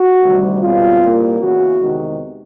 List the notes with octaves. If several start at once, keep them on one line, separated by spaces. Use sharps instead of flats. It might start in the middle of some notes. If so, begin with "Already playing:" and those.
Already playing: F#4
D2 C3 D#3 G3
C#2 B2 G3 C4 F4
C2 A#2 G3 A#3
E2 C#3 E3 F#4
E2 C3 D#3 G#3